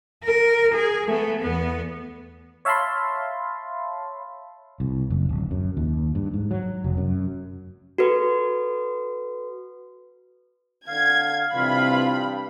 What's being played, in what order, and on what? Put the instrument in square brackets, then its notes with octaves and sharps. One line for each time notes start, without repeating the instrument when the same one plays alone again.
[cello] A#4
G#4
A3 B3
E2 B3
[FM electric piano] C#5 E5 F5 A5 B5 C6
[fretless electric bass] C2
F#1
D1
F#2
D#2
G2
G#2
F#3
F1
F#2
[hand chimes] F#4 A4 B4
[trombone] D3 [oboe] F5 [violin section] G#6
[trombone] G2 [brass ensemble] C3 E3 F4 [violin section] B5